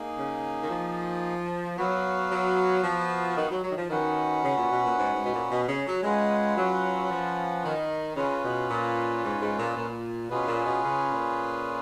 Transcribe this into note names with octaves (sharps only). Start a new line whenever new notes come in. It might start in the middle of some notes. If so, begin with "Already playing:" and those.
Already playing: A#3 D#4 G#4
C#3
D#3
F3
F#3 B3 F#4 B4 F5
F#3
F3
D#3
F#3
F#3
D#3
F3
D#3 C#4 F#4 B4 F#5
C#3
A#2
B2
A#2
G#2
G#2
B2
A#2
B2
C#3
F#3
G#3 C#4 F4 B4 F#5
F#3
F3
D#3
C#3 C#4 F4 B4
B2
A#2
G#2
G#2
A#2
A#2
B2 C#4 F4 G#4 B4
A#2
B2
C#3
A#2